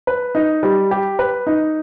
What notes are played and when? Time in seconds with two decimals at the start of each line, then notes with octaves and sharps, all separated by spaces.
0.07 B4
0.35 D#4
0.63 G3
0.91 G4
1.19 B4
1.47 D#4